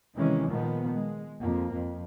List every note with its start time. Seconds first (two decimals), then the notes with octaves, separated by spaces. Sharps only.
0.17 C3 D#3 E3 G#3 C#4
0.49 A#2 D#3 F3 G#3 B3
0.91 G#3
1.40 F2 A#3
1.73 F2